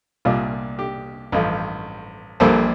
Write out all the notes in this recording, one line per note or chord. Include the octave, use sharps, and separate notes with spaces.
C2 A#2 G3 D4 F4
G4
A1 G2 F3
A#1 A#2 G3 A#3 A4 C5